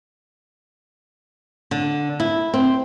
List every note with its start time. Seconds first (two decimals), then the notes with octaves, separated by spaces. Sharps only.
1.71 D3
2.20 E4
2.54 C4